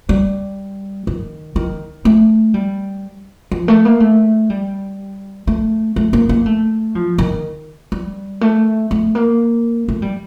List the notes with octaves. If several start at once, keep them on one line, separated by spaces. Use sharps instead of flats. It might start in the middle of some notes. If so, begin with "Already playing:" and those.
G3
D#3
D#3
A3
G3
F3
A3
A#3
A3
G3
A3
A3
A#3
A#3
A3
F3
D#3
G3
A3
A3
A#3
A3
G3